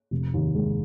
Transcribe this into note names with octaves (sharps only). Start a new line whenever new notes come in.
F1
D#2
G#3